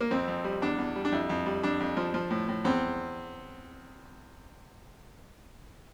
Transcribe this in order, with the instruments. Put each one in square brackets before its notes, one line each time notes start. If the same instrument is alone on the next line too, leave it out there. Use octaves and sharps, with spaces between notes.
[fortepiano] A#3
F2 C4
F2
G3
E2 D4
E2
G3
D4
F2 E4
F2
G3
F2 D4
F2
F3
F3
A2
A2
E2 C4